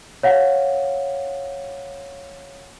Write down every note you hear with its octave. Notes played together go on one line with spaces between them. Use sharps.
C#5 F5 F#5